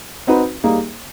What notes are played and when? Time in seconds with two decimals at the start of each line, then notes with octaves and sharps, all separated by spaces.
0.27 C4 D#4 F#4 B4
0.64 G3 A#3 D#4 G#4